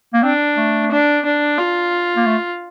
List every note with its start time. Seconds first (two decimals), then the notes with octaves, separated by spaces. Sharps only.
0.14 A#3
0.23 C4 D4
0.57 A3
0.91 D4
1.25 D4
1.58 F4
2.17 A#3
2.26 A3